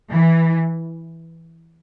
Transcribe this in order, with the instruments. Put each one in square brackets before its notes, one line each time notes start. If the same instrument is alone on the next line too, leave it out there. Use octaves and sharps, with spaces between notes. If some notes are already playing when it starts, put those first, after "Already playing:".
[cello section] E3